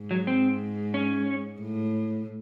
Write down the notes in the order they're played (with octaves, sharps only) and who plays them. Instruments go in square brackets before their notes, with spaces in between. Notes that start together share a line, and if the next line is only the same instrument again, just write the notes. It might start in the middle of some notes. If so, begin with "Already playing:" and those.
Already playing: [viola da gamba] G#2
[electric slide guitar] F#3
C4
C#4
[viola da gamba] A2